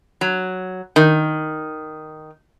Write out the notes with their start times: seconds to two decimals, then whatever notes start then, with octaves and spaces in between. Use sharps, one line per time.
0.21 F#3
0.96 D#3